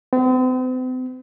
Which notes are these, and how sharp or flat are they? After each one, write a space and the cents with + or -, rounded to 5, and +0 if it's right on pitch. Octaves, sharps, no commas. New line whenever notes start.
C4 -45